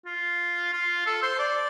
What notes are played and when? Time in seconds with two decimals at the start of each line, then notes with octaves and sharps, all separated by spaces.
0.06 F4
0.73 F4
1.06 A4
1.23 C5
1.39 D5